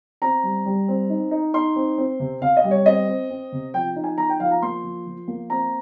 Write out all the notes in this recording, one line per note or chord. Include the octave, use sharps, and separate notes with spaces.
C4 A#5
G3
G3
C4
D#4
D#4
D#4 C6
C4
C4
C3
C3 F5
D#5
G3
C#5
C4 D#5
C4
C4
C3
F3 G5
D#4
G#5
F3 A#5
G5
F3 F5
A#5
A#3 C6
F3
F3
A#3
C4 A#5